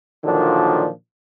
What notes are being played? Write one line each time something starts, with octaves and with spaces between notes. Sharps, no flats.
A#2 D3 D#3 F3 F#3 D4